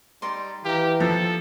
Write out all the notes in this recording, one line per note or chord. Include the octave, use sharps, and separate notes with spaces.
G3 D#4 D5 C6
E3 G4 F5 A#5
F3 A4